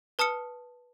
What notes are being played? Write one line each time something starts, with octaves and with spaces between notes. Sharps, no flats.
B4 A5 D#6 F6 C#7